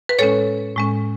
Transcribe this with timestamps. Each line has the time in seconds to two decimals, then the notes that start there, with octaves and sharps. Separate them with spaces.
0.09 B4
0.19 A2 G#3 C#4 A4 C#5
0.76 A2 G#3 C#4